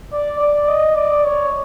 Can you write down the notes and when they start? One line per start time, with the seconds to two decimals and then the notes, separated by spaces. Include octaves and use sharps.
0.12 D5
0.39 D5
0.68 D#5
0.96 D5
1.25 C#5